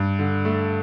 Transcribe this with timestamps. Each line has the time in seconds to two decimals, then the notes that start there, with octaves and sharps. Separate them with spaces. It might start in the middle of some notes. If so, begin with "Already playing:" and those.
Already playing: G2
0.19 D3
0.45 A3